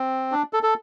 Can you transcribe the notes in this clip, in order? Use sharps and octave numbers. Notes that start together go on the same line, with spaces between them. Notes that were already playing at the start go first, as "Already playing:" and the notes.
Already playing: C4
D4
A4
A4